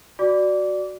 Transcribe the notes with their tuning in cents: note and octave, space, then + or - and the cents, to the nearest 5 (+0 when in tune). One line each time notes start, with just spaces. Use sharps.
F#4 +0 D5 +0 D6 -20